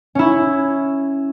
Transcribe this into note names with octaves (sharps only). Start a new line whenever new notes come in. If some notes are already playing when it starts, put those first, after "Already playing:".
C#4 E4